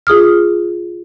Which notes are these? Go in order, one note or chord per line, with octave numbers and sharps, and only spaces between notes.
F4 G#4 D#6 F6